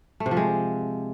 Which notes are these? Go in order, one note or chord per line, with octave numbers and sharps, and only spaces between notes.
A3
C3
F3
G#3